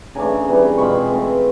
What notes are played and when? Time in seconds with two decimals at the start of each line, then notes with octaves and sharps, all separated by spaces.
0.15 C#3 E3 A3 D4 G#5 A#5
0.47 C3 E3 G3
0.77 B2 G#3 C4 F4 B5 C#6
1.09 E3 A3 C4 E4